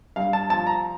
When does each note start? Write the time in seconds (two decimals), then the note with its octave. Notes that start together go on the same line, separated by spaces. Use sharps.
0.16 G2 F5
0.33 A5
0.49 F3 A5
0.67 A#5